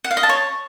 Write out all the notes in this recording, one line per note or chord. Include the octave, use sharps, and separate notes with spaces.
F#5
F5
D#5
A5
C#5